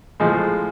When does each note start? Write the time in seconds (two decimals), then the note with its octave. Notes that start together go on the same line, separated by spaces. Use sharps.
0.20 A2 F3 G#3